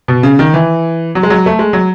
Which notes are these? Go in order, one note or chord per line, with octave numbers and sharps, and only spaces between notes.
B2
C#3
D#3
E3
F#3
G#3
F#3
A3
G#3
F#3